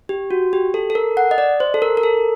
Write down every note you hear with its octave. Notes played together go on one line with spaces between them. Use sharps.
G4
F#4
G4
A4
A4
A#4
F#5
D#5
D5
C5
A4
A#4
A#4
A4